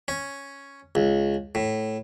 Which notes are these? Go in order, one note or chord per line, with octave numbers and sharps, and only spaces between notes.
C#4
C#2
A2